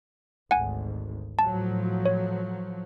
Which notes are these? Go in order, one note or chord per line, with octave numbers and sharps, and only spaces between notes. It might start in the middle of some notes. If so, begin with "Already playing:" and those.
G#1 D2 F#5 G#5
A2 F3 F#3 A5
C#5